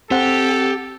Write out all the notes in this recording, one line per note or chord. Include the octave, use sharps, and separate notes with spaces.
C4 G4 A4 F#5